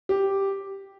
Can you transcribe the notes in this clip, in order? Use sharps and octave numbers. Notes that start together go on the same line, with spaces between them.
G4